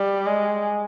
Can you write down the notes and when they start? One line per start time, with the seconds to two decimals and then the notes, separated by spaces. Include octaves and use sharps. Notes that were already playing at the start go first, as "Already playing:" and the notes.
Already playing: G3
0.26 G#3